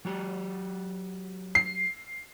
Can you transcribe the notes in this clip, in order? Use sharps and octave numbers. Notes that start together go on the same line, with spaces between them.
F#3 F#4 G4
C7